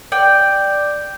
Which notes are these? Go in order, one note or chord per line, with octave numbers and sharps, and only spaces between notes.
D5 G5